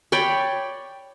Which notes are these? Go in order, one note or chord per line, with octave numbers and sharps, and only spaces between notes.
C#5 D5 G5 B5